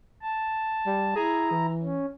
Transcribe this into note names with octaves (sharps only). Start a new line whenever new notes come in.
A5
G3
E4 G#4 A#5
E3
C#4